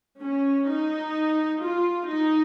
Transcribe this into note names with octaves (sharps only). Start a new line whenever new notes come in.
C#4
D#4
F4
D#4